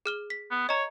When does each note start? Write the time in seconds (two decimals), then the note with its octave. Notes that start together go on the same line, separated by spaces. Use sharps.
0.06 G#4 F6 G7
0.30 B6
0.51 B3
0.69 C#5 D#5 A#5